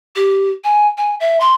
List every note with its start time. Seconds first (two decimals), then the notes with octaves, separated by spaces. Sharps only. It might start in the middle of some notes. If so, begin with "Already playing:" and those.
0.15 G4
0.64 G#5
0.97 G#5
1.20 E5
1.40 C6